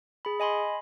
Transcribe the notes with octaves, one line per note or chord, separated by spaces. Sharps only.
G#4 B5
D#5 G#5 B5 C6